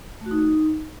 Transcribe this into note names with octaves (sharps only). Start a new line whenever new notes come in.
A3
F#4
D#4